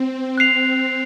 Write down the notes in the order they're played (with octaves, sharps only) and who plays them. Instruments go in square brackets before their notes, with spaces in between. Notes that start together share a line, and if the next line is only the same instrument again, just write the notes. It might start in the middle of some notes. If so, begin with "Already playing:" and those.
Already playing: [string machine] C4
[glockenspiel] F#6 C7 F7